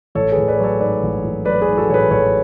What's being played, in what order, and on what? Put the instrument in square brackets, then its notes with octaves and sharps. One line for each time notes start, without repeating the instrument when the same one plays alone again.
[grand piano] A1 A4 C#5
G#4 B4
A1
B4 D5
F#3 A4 C#5
G#2 B4 D5
A1
A1
F#3 B4 D5
G#4 B4
G#2
F#4 A4
A1 C#5
G#4 B4
A1 A4 C#5